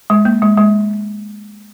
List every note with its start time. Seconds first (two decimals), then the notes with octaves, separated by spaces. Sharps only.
0.10 G#3
0.25 A#3
0.42 G#3
0.57 G#3